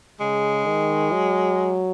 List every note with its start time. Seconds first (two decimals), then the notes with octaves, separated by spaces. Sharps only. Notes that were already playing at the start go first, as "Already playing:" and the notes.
0.20 C#3 G#3
0.67 D#3
1.12 F#3